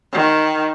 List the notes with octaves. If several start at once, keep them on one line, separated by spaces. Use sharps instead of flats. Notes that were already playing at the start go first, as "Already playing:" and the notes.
D#3